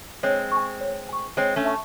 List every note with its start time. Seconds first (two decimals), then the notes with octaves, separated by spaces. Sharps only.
0.23 G#3 C4 C#5
0.52 C#6
0.57 G#5
0.81 C#5
1.09 G#5 C#6
1.37 G#3 C4 C#5
1.56 A3 C#4
1.65 E5 A5 C#6